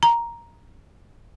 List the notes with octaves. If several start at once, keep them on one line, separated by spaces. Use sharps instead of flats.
A#5